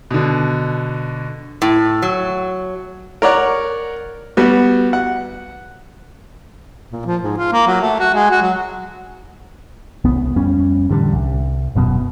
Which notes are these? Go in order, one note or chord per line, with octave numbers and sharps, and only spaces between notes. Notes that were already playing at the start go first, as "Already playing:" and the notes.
B2 D3
A2
F#3
A#4 C#5 D5 F#5
G3 B3 F#4
F#5
A#2
F3
G#2
F4
A#3
F#3
A3
F#4
G#3
F#4
F#3
C2 B3
F2 G3 C#4
A1 D3 F3 G3
C2
D#1 F#2 B2